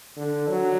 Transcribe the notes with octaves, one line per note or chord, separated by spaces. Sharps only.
D3
F#3